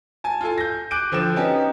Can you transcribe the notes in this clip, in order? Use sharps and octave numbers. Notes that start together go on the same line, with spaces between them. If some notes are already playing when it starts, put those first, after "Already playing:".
G#5 A5
F4 A4 G#5
G6 A#6
D6 F#6 G6 D7 D#7
D3 F3 G5 E7
B3 C#4 D#4 G4